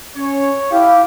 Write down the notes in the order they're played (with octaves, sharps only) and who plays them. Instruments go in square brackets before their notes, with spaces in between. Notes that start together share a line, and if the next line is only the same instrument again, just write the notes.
[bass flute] C#4 [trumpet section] C#5
[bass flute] E4 [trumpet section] G4 [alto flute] F5